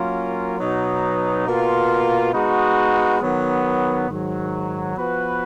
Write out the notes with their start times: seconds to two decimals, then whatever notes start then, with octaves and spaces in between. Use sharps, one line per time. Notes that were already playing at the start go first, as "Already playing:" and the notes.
Already playing: F#3 A#3 C#4 F4 A#4
0.59 B2 F#3 B3 D#4
1.47 B2 A#3 F4
2.33 G#3 B3 D#4 F#4
3.21 D#3 F#3 B3
4.08 G#2 D#3 F#3
4.95 F3 B3 F#4 B4